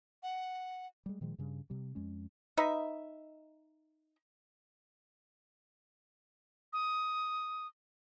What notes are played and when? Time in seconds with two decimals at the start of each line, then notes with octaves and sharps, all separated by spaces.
0.23 F#5
1.06 G3 G#3
1.21 A#2 D#3 F3 G#3
1.38 G2 C#3 G3
1.70 C3 G3
1.95 F2 G#3 C#4
2.57 D#4 B4 D#5 E5
6.73 D#6